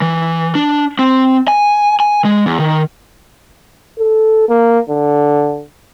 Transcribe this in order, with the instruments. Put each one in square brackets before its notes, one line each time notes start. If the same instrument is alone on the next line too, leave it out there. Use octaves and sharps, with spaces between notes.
[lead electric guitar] E3
D4
C4
G#5
G#5
G#3
E2
D#3
[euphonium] A4
A#3
D3